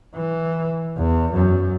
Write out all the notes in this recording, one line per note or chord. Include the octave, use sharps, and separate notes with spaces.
E3
E2
F#2